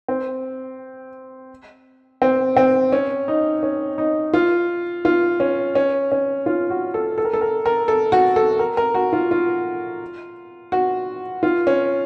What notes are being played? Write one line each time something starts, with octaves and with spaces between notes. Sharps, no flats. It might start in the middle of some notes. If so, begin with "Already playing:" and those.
C4
C4
C4
C#4
D#4
C#4
D#4
F4
F4
C#4
C#4
C#4
F4
F#4
A4
A4
A#4
A4
A#4
A#4
A4
F#4
A4
A#4
A#4
F#4
F4
F4
F#4
F4
C#4